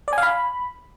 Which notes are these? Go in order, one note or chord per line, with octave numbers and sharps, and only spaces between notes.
D5
G#5
F5
B5